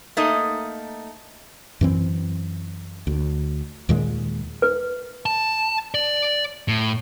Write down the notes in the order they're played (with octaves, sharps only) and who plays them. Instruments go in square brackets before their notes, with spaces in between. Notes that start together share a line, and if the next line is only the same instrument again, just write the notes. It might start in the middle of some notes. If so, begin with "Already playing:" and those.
[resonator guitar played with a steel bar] A3 A#3 D#4 D#5
[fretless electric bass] F#2 E3 C4
D2
D#2 A#2 D#3 G#3
[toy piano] B4
[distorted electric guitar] A5
D5
A2